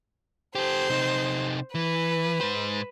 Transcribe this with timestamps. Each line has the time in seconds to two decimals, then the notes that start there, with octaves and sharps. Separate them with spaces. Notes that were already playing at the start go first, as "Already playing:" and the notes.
0.55 G4 A4 C5
0.90 C3 D#4
1.75 E3 B4
2.41 G#2 C5